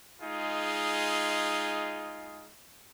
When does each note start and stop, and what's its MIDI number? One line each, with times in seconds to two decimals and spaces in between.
0.22 2.50 56
0.22 2.50 63
0.22 2.50 65
0.22 2.50 68